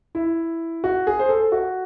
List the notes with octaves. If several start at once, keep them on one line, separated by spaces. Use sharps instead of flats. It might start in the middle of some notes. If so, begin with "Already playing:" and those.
E4
F#4
G#4
C5
A4
F#4